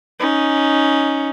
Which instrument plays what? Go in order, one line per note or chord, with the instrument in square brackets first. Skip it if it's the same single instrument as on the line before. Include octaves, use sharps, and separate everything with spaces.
[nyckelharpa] C#4 D#4